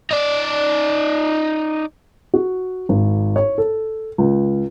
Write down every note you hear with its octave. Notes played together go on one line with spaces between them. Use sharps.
D#4 D5
F#4
G#1
C#5
A4
C#2